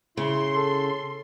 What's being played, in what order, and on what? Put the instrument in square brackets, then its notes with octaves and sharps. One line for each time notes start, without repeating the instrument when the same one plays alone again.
[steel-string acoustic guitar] C#3 [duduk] E4 [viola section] C6
[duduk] A4